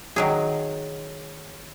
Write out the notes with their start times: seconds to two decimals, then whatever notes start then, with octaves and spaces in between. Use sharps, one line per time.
0.16 D#3 F#3 G#4